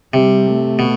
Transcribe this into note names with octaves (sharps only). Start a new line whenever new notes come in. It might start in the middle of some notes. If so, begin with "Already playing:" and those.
C3 G3
A3
B2